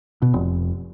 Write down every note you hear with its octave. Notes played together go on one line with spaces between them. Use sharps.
B2
F1